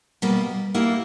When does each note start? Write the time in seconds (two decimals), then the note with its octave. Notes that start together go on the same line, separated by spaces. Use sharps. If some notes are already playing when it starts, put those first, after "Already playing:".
0.22 B2 G3 A#3
0.74 G3 A#3 E4